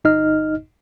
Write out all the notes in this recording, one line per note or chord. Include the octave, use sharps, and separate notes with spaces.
G1 D#4 D#5 F6